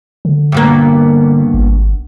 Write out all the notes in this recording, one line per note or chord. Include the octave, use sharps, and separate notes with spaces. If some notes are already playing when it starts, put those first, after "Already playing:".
D3
G2 B2 A#3
G#1